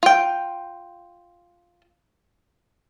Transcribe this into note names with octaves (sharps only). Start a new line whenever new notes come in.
F4 G5